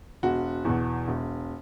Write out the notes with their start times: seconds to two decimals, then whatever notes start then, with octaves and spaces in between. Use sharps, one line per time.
0.23 E1 F#4
0.65 E2 B2
1.08 E1